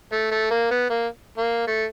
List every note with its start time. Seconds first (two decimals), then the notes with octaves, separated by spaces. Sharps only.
0.13 A3
0.32 A3
0.51 A#3
0.71 B3
0.90 A#3
1.38 A#3
1.67 A3